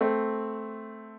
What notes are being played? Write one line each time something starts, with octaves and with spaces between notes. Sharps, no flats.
A3 C4